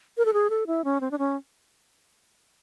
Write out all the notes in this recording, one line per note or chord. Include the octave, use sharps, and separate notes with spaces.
A#4
A4
G#4
A4
E4
C#4
C4
D4
C#4